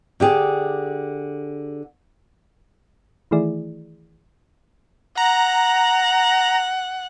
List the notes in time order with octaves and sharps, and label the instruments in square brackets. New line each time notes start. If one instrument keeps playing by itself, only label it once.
[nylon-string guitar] D3 G4 G#4
[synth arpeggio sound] D#3 E3 A3 E4 G#4 D5
[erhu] F#5 [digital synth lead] A#5